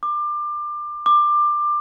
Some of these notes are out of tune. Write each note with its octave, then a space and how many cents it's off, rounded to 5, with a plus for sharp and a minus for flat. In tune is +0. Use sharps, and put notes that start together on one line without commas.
D6 +25
D6 +20